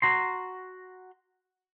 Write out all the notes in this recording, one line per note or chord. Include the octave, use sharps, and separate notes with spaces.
F#4 A#5 C6